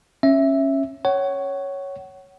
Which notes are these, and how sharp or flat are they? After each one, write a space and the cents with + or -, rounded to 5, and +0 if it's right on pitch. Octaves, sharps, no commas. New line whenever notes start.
C#4 -15 E5 +0
C#5 +0 F#5 +30